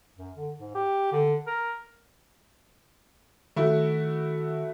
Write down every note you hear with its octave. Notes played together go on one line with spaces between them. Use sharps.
F#2
D3
G#2
G4
D3
A#4
D#3 A3 E4 F#4